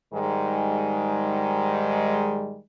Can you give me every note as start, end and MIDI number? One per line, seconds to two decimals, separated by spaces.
0.13 2.59 44
0.13 2.59 51
0.13 2.59 55
0.13 2.59 56